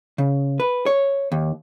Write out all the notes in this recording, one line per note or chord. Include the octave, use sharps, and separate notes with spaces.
C#3
B4
C#5
D#2